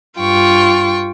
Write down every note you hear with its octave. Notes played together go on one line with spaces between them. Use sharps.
G2 F4 G5 C#6